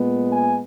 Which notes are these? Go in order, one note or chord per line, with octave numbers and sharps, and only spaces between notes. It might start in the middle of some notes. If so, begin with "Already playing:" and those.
Already playing: A#2 G#3 B3
G#5